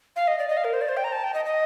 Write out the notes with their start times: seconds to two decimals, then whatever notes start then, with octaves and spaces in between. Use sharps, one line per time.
0.16 F5
0.28 D#5
0.39 D5
0.48 D#5
0.57 F5
0.64 A#4
0.73 C5
0.81 D5
0.89 C5
0.97 G5
1.04 A#5
1.12 A5
1.24 G5
1.34 D#5
1.45 D#5